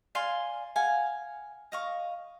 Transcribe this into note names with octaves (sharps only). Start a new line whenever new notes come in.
D5 F5 G#5 C6
F5 F#5 G#5
D#5 F5 C#6